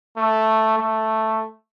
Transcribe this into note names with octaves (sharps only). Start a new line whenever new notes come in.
A3
A3